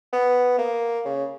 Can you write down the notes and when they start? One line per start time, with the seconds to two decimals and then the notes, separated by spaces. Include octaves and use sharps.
0.13 B3
0.58 A#3
1.05 C#3